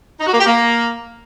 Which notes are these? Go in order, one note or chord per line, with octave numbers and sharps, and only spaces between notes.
D#4
F#4
A#3
G4
A#3